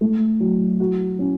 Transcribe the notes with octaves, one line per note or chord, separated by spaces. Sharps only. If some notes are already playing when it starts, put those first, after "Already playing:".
A3
F#3
F#4
C#4